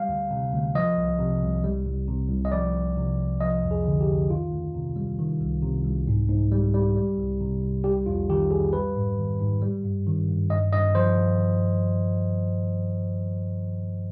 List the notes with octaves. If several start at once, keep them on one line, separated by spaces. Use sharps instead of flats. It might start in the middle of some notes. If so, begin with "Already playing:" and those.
Already playing: G3 F5
D2
C3
D2
F3 D#5
C2
C3
C2
G3
C2
C3
C2
D#5
F3 D5
C2
C3
C2
F3 D#5
F2
G#4
D3
G4
F2
D#3 F4
D2
C3
G3
D#3
C2
C3
C2
G#2
G#2
G3
G3
G3
C2
C3
C2
G3 G4
F2 F4
D#3 G4
F2 G#4
G3 B4
G#2
D#3
G#2
G3
G2
D#3
G2
G2 D#5
G2 D#5
F3 C5